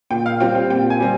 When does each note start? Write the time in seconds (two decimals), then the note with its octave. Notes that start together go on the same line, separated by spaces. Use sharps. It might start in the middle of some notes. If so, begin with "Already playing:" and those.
0.10 A#2 G5
0.26 F5
0.40 G3 C4 F4 G5
0.55 G5
0.70 A#2 G5
0.90 G#5
1.00 G3 C4